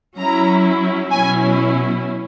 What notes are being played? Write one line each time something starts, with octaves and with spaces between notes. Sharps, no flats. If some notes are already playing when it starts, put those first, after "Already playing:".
F#3 C#4 E4 A#5
B2 F#3 C#4 E4 G#5